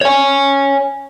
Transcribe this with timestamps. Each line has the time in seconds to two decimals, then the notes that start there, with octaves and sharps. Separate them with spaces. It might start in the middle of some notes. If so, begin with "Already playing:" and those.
0.01 C#5 G#5